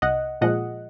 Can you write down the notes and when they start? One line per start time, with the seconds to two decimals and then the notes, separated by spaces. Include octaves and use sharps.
0.02 C2 D#5 F#5
0.41 A#2 F3 G#3 D#5 F#5